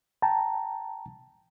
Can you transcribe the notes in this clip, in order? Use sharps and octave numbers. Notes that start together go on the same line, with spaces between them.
G5 A5 A#5